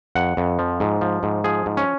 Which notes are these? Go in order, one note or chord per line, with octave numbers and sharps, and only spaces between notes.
F2 F#5
F2
F3
G#2
F3
G#2
F3 G#4
G#2
C#4